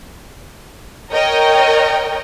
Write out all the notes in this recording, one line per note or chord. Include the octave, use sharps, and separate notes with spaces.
A#4 C#5 D#5 G5